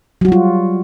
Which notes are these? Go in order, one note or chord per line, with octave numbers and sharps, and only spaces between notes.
F#3 G3 F4 F#4